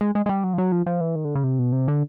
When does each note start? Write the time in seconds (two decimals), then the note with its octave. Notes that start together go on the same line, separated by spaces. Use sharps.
0.01 G#3
0.15 G#3
0.26 G#3
0.29 G3
0.44 F#3
0.53 F3
0.58 F#3
0.72 F3
0.86 F3
1.01 E3
1.16 D#3
1.25 D3
1.35 C#3
1.44 C3
1.59 B2
1.73 C3
1.88 D3